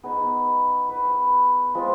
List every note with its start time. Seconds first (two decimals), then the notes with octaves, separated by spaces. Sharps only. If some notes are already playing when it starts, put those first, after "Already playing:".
0.03 B3 D#4 G#4
0.89 B4
1.75 F3 G#3 C4 F4